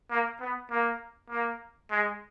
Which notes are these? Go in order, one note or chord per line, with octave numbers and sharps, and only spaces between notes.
A#3
B3
A#3
A#3
G#3